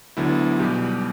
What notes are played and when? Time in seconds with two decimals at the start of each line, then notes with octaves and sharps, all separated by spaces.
0.17 D2 D3 F#3 B3 E4
0.59 B1 B2 G3 G4